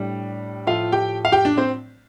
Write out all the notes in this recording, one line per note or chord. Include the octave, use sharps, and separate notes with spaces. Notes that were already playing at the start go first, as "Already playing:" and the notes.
Already playing: A2 G3 D4
A2 F3 A3 F4 F5
G4 G5
F5
G4 G5
D4 D5
C4 C5